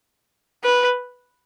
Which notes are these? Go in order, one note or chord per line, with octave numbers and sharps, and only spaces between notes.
B4